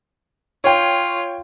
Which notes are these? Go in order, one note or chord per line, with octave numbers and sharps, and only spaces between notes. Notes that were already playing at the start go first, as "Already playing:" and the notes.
F4 C#5 G5